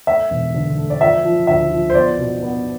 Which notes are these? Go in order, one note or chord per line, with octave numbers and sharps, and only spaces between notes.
A3 E5
E1
D3
A3
D5
F3 E5
F3
D2 E5
F3
C5
B3 D5
B2
B3